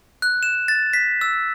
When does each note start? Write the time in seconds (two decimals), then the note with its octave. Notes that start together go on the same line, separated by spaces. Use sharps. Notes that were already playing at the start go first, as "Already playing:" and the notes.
0.22 F#6
0.43 E7
0.68 A6
0.93 B6
1.21 E6